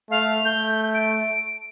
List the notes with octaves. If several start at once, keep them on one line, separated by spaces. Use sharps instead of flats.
A3 F5
A3 G6
D7